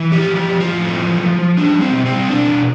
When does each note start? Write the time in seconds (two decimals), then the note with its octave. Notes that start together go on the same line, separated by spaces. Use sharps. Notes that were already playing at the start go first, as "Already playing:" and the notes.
Already playing: E3
0.12 F3 G4
0.31 F3 G4
0.48 F3
0.60 F4
0.66 A2
0.84 A3
1.03 F3
1.20 F3
1.39 F3
1.57 G3 D4
1.74 G3
1.81 C4
1.93 B2
2.06 C4
2.11 G3
2.29 B2 D4
2.47 B2